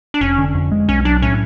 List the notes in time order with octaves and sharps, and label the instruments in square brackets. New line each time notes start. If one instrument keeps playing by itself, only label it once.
[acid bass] D4
[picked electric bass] F1 [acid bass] C#4
[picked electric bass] D3
F2
G#3
[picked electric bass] B1 [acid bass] C#4
[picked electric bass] F#3 [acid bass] D4
[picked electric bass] A2 [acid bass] C#4